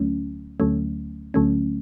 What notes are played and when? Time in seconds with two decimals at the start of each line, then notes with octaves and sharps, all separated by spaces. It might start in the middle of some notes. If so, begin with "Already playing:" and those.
Already playing: D2 D3 F#3 A3 C#4
0.60 D2 D3 F#3 A3 C#4
1.34 D2 D3 F#3 A3 C#4